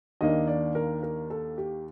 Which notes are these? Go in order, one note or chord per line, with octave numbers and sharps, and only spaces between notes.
D#2 D#3 A#3 D4 D#5
D5
A#4
A#4
A4
G4